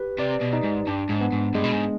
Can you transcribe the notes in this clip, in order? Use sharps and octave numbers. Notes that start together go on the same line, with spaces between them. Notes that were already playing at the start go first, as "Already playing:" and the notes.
Already playing: G4 B4
C3 D5
B2
D#4
G#2
G2 D4
G#2
B3
G#2
G2 G#3
B2
G#2